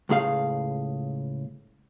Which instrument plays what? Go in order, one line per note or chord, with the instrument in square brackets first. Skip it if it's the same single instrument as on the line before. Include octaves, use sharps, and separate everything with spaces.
[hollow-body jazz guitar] C#2 A2 G#4 F5